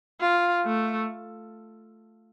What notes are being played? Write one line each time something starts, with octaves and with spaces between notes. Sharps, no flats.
F4
A3